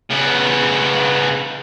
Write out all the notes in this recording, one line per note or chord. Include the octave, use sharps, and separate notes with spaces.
C#3 B3